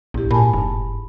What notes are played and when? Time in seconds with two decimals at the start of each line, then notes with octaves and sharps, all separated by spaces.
0.14 A#1 G#2 E4 G4
0.31 A#2 G#5 A5 B5
0.53 F1 G2